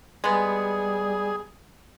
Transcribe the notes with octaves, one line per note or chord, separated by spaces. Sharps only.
G3 G#3 B3 G#4